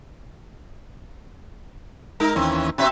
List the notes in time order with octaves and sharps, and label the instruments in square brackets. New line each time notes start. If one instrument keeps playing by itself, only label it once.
[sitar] G#3 D#4 A#4
[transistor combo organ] D#2 E3 C#4 [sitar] C4
[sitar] B2 C4 E5 [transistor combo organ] C#4